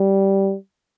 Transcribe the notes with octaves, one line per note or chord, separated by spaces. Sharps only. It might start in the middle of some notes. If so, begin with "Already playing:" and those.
Already playing: G3